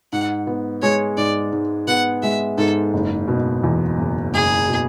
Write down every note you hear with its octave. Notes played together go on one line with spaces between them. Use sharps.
G#2 F#5
B3
G#3 C#5
G#2 D5
G#2
B3 F#5
G#3 E5
G#2 A4
F#1
B2
E2
F#1
F#1 G#4
B2